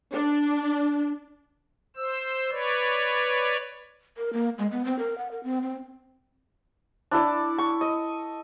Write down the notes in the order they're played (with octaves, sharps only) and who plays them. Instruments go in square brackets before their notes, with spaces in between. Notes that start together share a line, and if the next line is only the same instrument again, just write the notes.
[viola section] D4
[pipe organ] C5 E6
B4 C#5 D5
[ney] A#4
A#3
G#3
B3
C4
A#4
F#5
A#4
C4
C4
[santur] D4 E4 A4 D5
C#6
D#5